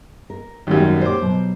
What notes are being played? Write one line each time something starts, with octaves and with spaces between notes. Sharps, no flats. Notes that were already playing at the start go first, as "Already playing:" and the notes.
A#4
G#1 F#2 G3 B3 G4
A#2 G4 C5 C#5 D6
B2 F#3